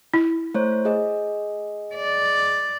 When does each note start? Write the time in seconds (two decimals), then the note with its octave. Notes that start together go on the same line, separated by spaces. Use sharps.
0.14 E4
0.54 A3 C5 C#5
0.85 G#4 D#5
1.95 D5